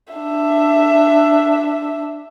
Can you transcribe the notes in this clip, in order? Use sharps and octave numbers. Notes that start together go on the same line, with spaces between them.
D4 E5